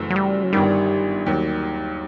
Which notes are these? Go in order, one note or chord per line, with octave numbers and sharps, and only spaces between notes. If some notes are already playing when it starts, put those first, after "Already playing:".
Already playing: F#1 F#2 E3 A3
F#3
G3
F#3
G1 G2 D#3 G3
D#2 D#3 F#3